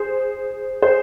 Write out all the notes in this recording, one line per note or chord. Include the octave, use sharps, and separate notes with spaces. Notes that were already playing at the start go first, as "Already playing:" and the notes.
Already playing: G#4 C5
G#4 C5